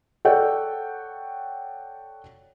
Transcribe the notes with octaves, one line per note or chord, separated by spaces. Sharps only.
A4 C#5 D5 F#5 G5